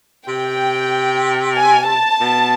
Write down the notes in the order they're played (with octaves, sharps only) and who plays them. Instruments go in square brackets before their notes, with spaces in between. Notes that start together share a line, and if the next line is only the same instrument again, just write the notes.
[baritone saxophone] C3 [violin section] G5
[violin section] G#5
A5
[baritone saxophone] B2